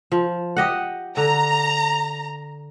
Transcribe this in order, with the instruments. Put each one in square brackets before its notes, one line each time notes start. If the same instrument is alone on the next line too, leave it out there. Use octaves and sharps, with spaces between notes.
[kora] F3
G4 D#5 F#5
[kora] D3 [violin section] A#5